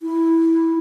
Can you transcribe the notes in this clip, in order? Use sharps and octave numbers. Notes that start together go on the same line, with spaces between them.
E4